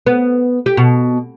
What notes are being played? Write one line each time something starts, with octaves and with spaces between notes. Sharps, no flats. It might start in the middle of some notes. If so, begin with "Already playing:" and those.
B3
G4
B2